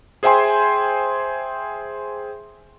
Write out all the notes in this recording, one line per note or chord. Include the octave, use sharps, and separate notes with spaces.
G#4 C5 E5 G5 G#5 C6